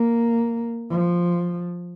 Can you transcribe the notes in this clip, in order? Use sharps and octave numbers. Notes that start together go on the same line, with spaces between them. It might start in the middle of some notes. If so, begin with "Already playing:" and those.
Already playing: A#3
F3